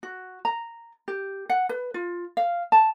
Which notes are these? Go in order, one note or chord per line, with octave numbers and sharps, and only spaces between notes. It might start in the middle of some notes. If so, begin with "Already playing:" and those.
F#4
A#5
G4
F#5
B4
F4
F5
A5